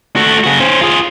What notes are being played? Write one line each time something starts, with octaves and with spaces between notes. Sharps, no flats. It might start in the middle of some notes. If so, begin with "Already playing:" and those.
A3 F#4
C#3 F#4
C#4 C5
F4 G#4